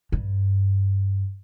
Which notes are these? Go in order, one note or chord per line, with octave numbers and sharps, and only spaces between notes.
G2